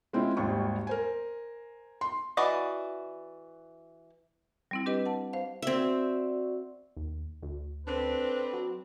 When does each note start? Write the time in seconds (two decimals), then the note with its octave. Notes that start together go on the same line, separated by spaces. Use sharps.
0.13 G#3 C4 C#4 E4 F4
0.37 G#1 D#2 G3 C#6
0.87 A#4 C5 G#5
2.01 C6
2.37 E3 F#4 D5 D#5
4.71 G3 C4 E4
4.86 D4 G4 B4 D#5
5.06 F#5 A5
5.33 C5 F5
5.62 C4 F#4 D5 E5
6.97 D#2
7.43 D2
7.86 C4 D4 A4 B4
8.53 F#3